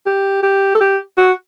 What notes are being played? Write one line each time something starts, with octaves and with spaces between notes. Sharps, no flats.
G4
G4
A4
G4
F#4